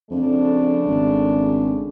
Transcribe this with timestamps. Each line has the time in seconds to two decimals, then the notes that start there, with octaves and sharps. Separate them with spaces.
0.11 F2 C#3 A3 D4
0.87 G#1